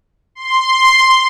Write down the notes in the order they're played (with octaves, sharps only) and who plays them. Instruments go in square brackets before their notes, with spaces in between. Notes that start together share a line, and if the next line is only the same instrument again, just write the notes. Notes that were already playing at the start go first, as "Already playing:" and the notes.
[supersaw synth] C6